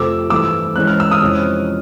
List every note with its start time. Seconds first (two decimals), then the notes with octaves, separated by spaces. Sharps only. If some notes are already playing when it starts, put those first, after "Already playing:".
Already playing: F2 C3 F3 A3 D6 E6
0.30 G2 E3 A3 D6 E6
0.76 G#2 E3 G#3 C#4 F#6
0.87 F6
1.00 E6
1.11 D#6 F6
1.21 F2 C3 E3 G#3 C#4